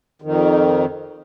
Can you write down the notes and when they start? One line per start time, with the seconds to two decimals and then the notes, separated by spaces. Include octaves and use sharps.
0.22 F2 D#3